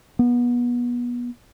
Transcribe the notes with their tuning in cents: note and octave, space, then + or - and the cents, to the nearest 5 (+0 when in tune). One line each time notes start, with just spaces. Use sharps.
B3 -30